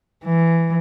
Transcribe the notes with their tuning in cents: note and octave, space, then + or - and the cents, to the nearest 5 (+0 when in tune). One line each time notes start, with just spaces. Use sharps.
E3 +10